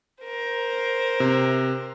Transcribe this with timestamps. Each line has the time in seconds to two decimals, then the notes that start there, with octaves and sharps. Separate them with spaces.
0.21 A#4 C5
1.20 C3